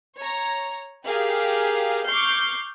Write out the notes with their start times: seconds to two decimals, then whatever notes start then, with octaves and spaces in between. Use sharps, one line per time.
0.19 C#5 A#5
1.06 G4 G#4 A#4 F5
2.06 C#6 D6 F6 G6 C7